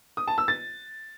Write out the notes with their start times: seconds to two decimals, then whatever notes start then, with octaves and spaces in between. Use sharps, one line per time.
0.17 D#6
0.27 A5
0.38 E6
0.48 A6